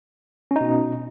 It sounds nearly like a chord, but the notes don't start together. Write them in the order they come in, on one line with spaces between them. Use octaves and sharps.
C#4 D#4 B2